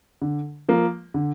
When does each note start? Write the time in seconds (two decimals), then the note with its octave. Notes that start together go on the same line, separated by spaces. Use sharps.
0.22 D3
0.69 F3 A#3
1.14 D3